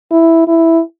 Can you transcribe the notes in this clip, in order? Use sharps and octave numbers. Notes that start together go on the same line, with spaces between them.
E4
E4